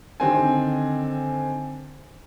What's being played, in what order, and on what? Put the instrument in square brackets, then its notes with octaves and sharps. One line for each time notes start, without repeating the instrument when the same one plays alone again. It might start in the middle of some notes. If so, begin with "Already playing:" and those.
[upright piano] D3 D#3 C4 G#5